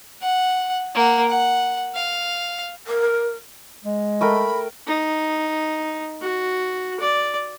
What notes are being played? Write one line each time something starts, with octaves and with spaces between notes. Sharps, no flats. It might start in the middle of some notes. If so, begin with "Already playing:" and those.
F#5
A#3 F#5
F#5
F5
A#4
G#3
A3 A#4 G5 B5
D#4
F#4
D5